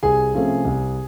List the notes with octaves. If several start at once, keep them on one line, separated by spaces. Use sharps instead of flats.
C2 G#4 G#5
C3 F3 A3 C#4
C2